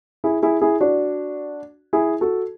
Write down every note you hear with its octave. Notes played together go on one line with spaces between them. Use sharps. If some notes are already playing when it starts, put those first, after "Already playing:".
E4 G#4
E4 G#4
E4 G#4
D4 F#4
E4 G#4
F#4 A4